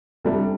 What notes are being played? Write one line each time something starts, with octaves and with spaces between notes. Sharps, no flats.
C3 G3 D4 A4